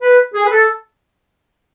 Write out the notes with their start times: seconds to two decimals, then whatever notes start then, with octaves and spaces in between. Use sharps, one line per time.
0.02 B4
0.34 G#4
0.46 B4
0.52 A4